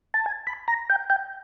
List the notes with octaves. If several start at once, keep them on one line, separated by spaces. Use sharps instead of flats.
A5
G#5
B5
A#5
G5
G5